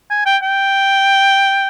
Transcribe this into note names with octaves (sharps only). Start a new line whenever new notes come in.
G#5
G5
G5